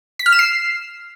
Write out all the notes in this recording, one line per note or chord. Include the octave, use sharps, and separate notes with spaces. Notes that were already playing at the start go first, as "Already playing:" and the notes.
B6
F6
E7
C7